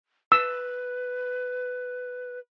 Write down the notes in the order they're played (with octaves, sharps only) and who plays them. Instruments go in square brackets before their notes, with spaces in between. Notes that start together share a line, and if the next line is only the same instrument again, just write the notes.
[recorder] B4 [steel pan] E6